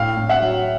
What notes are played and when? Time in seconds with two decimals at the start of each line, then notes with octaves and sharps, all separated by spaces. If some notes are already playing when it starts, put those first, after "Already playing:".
Already playing: A2 F5 G5
0.17 A2
0.29 E5 F#5
0.42 F#3